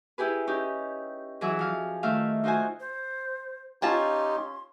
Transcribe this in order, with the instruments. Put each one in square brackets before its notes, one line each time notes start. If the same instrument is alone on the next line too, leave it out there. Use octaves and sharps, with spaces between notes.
[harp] E4 G4 G#4 B4
C#4 D#4 G4
E3 F#3 E4 G#4 E5
F3 F5
D#3 A3 F4 E5 F5
D#4 F4 F#4 C5 G#5
[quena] C5
[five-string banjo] C#4 F4 A5 [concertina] D#4 G4 [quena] C6